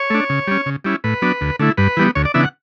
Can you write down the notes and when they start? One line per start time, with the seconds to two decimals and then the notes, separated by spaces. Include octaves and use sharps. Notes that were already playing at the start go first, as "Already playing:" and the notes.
Already playing: C#5
0.10 A3 D4
0.30 C#3
0.47 G3 C#4
0.66 C#3
0.84 G3 C#4 E4
1.04 A2 B4
1.22 F#3 B3 D4
1.41 D2
1.59 D3 A3 E4
1.78 G2 B4
1.97 E3 G3 B3
2.15 D2 C#5
2.25 D5
2.34 C#3 E3 B3 D4 E5
2.43 F#5